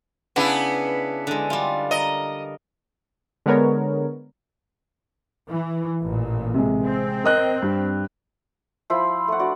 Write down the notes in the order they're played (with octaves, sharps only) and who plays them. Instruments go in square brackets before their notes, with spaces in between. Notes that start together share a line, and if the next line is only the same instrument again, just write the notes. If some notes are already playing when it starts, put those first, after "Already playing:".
[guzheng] C#3 [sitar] B3 D4 E4
[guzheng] D3 G#3
G3 F4
[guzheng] A#4 [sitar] D#5
[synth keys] D3 G#3 B3 A#4 C#5
[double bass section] E3
A1 A#2
[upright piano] C3 G#3
[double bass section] C4
[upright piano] A#4 D#5 F#6
G2
[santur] F3 E4 C5 B5
A3 F#5
D4 F#4 D5